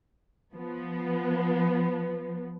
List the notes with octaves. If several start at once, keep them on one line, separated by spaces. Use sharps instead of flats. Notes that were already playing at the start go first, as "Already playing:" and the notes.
F3 B3